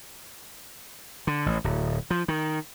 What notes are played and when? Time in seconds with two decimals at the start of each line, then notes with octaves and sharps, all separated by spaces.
1.27 D3
1.46 A1
1.64 D1
2.10 F3
2.28 D#3